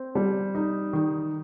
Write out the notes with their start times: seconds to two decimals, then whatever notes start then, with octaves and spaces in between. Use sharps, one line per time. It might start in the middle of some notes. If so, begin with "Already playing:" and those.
Already playing: C4
0.15 G3
0.55 D#4
0.93 D#3